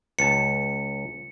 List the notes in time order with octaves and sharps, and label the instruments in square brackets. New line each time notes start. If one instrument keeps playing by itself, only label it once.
[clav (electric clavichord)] C#2 A5 [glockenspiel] C#7